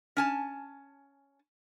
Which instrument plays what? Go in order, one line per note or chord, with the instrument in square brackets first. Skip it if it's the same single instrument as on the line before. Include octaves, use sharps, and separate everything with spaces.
[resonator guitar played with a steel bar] C#4 G#5 A5